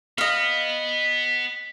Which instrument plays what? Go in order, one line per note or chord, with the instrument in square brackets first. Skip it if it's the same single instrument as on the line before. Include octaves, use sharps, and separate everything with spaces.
[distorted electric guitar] B3 [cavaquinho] D#5 F5